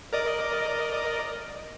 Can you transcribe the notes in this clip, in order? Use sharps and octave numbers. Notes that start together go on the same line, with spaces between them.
A#4 D5 D#5